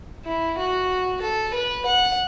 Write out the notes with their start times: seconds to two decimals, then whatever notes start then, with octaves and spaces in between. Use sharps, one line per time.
0.25 E4
0.58 F#4
1.21 A4
1.54 B4
1.86 F#5